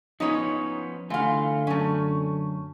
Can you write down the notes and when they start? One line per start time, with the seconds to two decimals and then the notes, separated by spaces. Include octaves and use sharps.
0.20 F3 B3 C#4 D#4 C#5
1.10 D3 E3 A3 F4 F5
1.67 F#2 A3 C#4